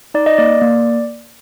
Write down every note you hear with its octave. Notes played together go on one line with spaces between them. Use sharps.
D#4 D5
D#5
A#3 D5
A#3